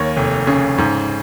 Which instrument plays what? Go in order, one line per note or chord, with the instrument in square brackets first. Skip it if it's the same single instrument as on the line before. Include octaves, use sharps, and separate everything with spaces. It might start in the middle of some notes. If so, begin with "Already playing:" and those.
Already playing: [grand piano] D#2 A#3 C#5
F1
C#3
G#2